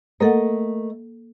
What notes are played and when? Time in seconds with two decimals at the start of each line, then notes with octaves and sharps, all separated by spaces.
0.20 A3 A#3 A4 A#4 D#5 F#5